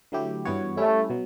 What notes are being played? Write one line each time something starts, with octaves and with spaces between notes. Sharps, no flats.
D3 F#3 A3 E4 G4
G2 E3 B3 F#4 C#5
G3 A3 C#4 E4
B2 F#3